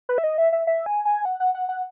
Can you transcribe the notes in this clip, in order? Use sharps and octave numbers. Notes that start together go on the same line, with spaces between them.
B4
E5
D#5
E5
E5
E5
G#5
G#5
F#5
F#5
F#5
F#5